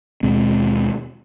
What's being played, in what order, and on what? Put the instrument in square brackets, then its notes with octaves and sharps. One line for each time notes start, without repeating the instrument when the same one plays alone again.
[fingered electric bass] D#2 B2 G#3 C4